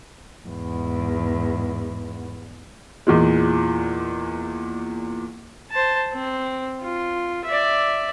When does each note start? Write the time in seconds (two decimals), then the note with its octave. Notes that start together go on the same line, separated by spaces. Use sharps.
0.48 E2 G#2
3.07 E2 A#2 G#3
5.71 C5 A5
6.13 C4
6.81 F4
7.45 D5 E5